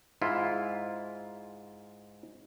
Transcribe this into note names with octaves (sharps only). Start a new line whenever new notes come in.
G#2 E4 F4